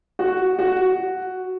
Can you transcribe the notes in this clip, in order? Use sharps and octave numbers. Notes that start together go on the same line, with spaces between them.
F#4
F#4